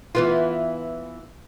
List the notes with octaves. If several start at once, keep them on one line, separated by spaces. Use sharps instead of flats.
E3 B3 F4